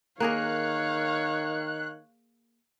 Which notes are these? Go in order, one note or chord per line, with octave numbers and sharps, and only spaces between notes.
D#3 A#3 G#4 A#4 C#5 F5 F#6